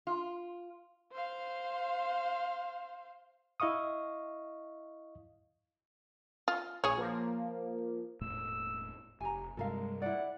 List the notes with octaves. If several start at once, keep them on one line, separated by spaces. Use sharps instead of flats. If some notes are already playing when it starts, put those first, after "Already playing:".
F4
C5 F5
E4 D#5 F5 C#6 D#6
F4
A#1 G#4 C#5
F3 A#3
E1 A2 A3 E6
F1 G4 G#5 A#5
G2 C3 G3 G#3 A4 A#4 F5
E4 D5 F#5